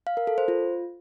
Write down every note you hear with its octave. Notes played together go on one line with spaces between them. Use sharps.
F5
A#4
A4
C5
F4